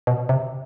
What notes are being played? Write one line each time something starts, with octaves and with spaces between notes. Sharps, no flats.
B2
C3